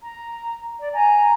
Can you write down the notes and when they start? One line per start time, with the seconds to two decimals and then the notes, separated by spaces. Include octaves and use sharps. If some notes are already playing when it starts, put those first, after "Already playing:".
0.02 A#5
0.79 D5
0.93 G#5 A#5